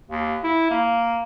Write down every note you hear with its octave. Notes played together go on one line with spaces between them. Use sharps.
D#2
E4
A#3